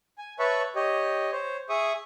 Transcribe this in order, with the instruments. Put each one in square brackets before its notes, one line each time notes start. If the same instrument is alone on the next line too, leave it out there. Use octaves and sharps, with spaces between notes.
[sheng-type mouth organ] G#5
B4 C#5 E5 A5 B5 C#6
G4 C#5 D#5
C5 C#5
G#4 E5 C#6 D#6